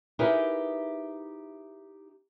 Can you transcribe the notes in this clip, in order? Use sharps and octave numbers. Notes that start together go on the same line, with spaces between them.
D#4 E4 G4 G#4 A#4 B4